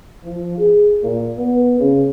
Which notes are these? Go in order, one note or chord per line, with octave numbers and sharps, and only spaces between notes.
F3
G#4
A#2
B3
C#3